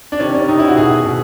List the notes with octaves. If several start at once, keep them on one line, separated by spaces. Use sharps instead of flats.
D4
C3 D#3 C#4
C#4
C3 D#3 D#4
E4
F#4
B2 G#4
B2